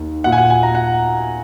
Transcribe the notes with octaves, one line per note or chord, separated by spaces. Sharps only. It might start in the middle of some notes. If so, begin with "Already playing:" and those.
Already playing: D#2 D#3
A#2 A#3 F#5
G#5
F#5
G#5
A#5
F#5